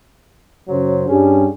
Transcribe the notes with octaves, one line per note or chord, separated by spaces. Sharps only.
F#2 C#3 F#3 C5
G2 G3 C#4 G#4